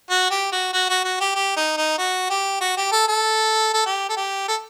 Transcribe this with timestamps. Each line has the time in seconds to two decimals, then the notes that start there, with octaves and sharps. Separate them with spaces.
0.10 F#4
0.31 G4
0.52 F#4
0.73 F#4
0.89 F#4
1.04 F#4
1.20 G4
1.35 G4
1.57 D#4
1.77 D#4
1.98 F#4
2.30 G4
2.60 F#4
2.77 G4
2.92 A4
3.08 A4
3.74 A4
3.86 G4
4.09 A4
4.17 G4
4.48 A4